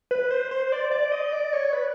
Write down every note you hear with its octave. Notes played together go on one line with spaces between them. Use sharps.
B4
C5
C5
D5
D5
D#5
D5
C#5
B4